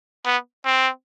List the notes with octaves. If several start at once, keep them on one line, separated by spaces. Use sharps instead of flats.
B3
C4